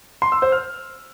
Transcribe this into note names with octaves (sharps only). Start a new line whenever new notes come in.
C6
E6
C5
F6